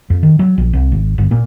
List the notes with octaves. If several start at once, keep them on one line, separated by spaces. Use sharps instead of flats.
F2
D#3
F#3
A#1
C2
G#1
G1
A#2